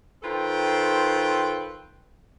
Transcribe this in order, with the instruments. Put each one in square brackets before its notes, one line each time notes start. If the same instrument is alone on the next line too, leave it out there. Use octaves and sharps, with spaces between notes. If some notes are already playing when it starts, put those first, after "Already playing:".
[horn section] D#3 F4 A4 B4 C5 G5